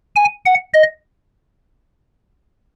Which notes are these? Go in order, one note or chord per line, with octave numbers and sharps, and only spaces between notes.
G#5
F#5
D#5